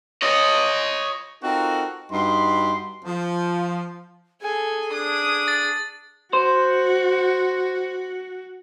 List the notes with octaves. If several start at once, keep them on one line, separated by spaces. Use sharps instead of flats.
C#5 D#5
C4 D#4 F4 F#4 A4 A#4
G2 D#4 F#4 B5 C6
F3
G#4 A4 G#5
D4 D#6
A6
F#4 C5